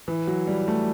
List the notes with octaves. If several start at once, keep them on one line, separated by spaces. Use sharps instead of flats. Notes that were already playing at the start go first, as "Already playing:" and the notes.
E3
F#3
G3
A3